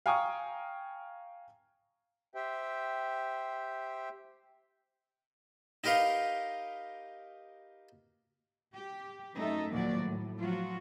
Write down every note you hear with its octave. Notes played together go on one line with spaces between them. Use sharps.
F5 G5 G#5 A#5 C#6 D#6
G4 C5 E5 G5
D#4 G4 A#4 B4 F5
G4
F#2 A3 D#4 A4 E5
D#2 A#2 F3 F#3 F#4 D5
A2
F3 F#3 F4 F#4